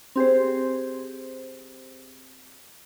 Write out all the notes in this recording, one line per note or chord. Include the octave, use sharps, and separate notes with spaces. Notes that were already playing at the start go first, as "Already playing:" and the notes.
C4 G4 G#4 C5